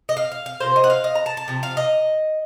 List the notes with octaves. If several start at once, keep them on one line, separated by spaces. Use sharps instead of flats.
D#5
F5
F5
F5
C3 F3 A#3 C5
D#5
F#5
F5
D#5
A#5
A5
A5
C3 F3
F5
D#5